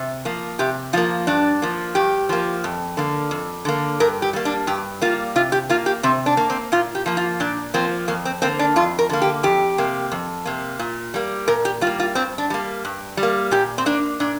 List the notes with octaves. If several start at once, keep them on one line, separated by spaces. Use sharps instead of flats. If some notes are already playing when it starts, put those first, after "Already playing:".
Already playing: C3
F3 A#3
C3 G4
F3 A#3 F4
G2 D4
F3 A#3
G2 G4
F3 A#3
F2
D3 A#3
F2
D3 A#3
G2 A#4
G4
G3 A#3
D4
G2 G4
G3 A#3 F4
C3 F4
G4
A#3 F4
G4
C3 C4
D4
A#3
C4
A#2 F4
G4
F3 A#3
F4
A#2 D4
F3 A#3 C4
F2 A#3
C4
D3 A#3 C4
D4
F2 F4
A#4
D3 A#3
G4
F2 G4
C3 A#3
F2
C3 A#3
A#2
G3 A#3
A#2 A#4
G4
G3 F4
A#3
F4
G2 C4
D4
G3 A#3
G2
G3
A#3
A#2 G4
C4
A#3 D4
A#2 D4